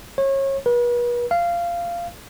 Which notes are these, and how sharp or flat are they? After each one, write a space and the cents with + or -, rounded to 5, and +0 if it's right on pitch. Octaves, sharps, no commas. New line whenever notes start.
C#5 -30
B4 -40
F5 -15